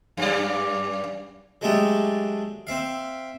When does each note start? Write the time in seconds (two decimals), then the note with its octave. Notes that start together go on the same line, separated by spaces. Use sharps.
0.17 F#2 G3 D5
1.61 F#3 G#3 A3 D4 G4
2.67 C4 E5 F5